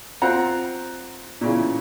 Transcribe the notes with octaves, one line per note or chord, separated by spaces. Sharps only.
C4 F4 C5 F#5 A#5
A#2 C#3 E3